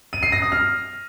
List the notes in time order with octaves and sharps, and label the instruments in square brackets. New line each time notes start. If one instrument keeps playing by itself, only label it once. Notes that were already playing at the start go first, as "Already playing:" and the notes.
[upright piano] D#7
C7
A#6
D#6
F6